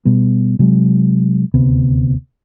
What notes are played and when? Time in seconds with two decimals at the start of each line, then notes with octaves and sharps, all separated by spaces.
0.05 B2 G3 B3
0.59 C3 F#3 G#3
1.54 D#1 D2 C3 B3